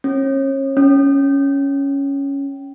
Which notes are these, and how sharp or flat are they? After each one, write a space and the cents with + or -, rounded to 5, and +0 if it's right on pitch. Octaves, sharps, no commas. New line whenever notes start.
C#4 -35
C#4 +0